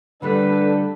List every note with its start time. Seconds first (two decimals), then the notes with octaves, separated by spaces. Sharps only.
0.22 D3 G3 A3 D4 G4 A4 B4